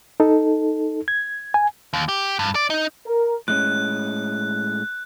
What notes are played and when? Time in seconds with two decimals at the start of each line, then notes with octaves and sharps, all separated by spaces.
0.20 D#4 A4
1.08 G#6
1.54 G#5
1.93 D#2
2.09 G4
2.39 G2
2.55 D5
2.70 D#4
3.06 A#4
3.48 A2 G#3 C#4 F#6